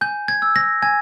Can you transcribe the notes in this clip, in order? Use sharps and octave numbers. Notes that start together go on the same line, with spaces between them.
G#5 G6
G#6
E6 G6
A#6
G#5 G#6